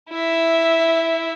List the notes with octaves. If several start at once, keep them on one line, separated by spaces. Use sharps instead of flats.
E4 E5